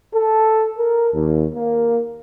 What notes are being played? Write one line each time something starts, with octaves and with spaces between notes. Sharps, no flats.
A4
A#4
D#2
A#3